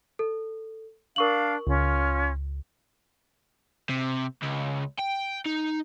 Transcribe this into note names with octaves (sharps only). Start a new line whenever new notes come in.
A4
D4 A#4 F5 C#6 F#7
C#2 C#4 F4
C3
C#2
G5
D#4